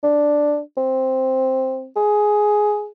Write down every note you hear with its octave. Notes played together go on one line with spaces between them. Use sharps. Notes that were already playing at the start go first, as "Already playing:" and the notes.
D4
C4
G#4